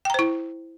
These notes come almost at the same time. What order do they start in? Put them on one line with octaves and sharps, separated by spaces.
G5 A#5 C5 E4